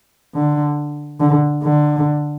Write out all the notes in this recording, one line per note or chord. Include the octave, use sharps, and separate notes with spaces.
D3
D3
D3